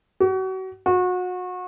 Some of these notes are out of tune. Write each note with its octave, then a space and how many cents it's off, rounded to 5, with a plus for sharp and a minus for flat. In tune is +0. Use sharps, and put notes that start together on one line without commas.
F#4 +35
F#4 -30